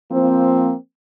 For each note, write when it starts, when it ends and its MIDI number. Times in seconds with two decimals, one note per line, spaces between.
0.12 0.74 53
0.12 0.74 58
0.12 0.74 60